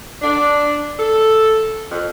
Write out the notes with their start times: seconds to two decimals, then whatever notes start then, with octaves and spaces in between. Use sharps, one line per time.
0.21 D4
0.98 A4
1.90 F2